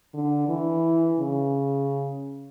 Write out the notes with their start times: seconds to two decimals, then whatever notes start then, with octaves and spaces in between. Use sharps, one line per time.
0.14 D3
0.49 E3
1.19 C#3